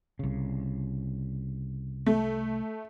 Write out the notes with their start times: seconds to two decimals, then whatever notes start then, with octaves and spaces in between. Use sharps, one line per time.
0.19 C2 C#3
2.06 A3